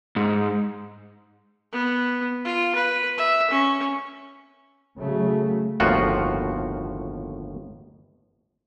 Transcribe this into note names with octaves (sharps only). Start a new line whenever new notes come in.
G#2
B3
F4
B4
E5
C#4
C#3 F#3 A3
G1 D#2 A2 F3 F4 F#4